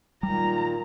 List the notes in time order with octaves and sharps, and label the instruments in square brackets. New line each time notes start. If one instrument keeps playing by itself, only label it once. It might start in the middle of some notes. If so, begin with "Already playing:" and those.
[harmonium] A#2 D#3 [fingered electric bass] G3 [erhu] A#5